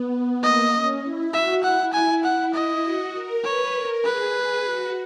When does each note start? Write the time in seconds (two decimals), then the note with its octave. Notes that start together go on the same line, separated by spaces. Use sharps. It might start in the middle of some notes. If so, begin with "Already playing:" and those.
Already playing: B3
0.42 A#3 D#5
0.73 C#4
1.03 E4
1.33 F#4 E5
1.63 E4 F#5
1.93 G#5
2.23 F#5
2.54 D#5
2.83 F#4
3.13 A#4
3.44 B4 C#5
3.74 A#4
4.04 G#4 B4
4.34 G#4
4.65 F#4